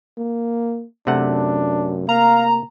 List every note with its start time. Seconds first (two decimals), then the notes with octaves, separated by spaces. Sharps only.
0.18 A#3
1.07 F#2 C3 A3 D4 F#5
2.09 A#3 F5 A#5